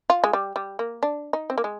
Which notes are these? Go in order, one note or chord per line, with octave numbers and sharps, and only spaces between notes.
F4
G#3
G3
G3
A#3
D4
D#4
C4
A#3
G#3